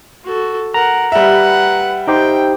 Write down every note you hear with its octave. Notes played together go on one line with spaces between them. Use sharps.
F#4 A4
A#4 F#5 A#5
G3 B4 E5 F#5
D#4 G4 C5 G5